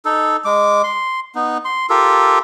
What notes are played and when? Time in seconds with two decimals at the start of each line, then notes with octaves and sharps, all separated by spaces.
0.05 D#4 A4
0.45 G#3 D6
0.84 C6
1.35 B3 D#4
1.65 C6
1.90 F4 G4 A4 A#4